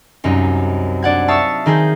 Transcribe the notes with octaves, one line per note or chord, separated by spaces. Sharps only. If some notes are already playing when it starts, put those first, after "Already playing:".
C2 F#2 D#4
D4 D5 F#5 G#6
E5 F5 A5 C#6 D#6 E6
D#3 D#4 G#4 C5